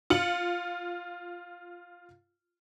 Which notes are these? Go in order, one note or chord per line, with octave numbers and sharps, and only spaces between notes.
F4 C#7 F#7